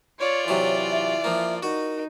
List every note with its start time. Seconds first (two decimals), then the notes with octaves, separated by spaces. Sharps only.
0.19 F4 C#5 D5
0.48 C3 E3 F#3 C#5 C6
0.90 E5
1.24 F3 A#3
1.63 D#4 F#4 A#4